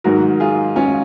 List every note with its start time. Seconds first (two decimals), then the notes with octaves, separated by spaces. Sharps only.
0.04 G#2 D#3 F#3 F#4 A#4
0.40 F4 G#4
0.76 C#4 F4